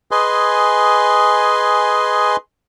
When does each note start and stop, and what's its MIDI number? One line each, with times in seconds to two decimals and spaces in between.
0.11 2.36 68
0.11 2.36 71
0.11 2.36 75
0.11 2.36 80
0.11 2.36 84